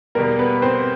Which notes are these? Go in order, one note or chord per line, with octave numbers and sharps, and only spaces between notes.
E2 B2 G3 A#3 A#4
B3 B4
C4 C5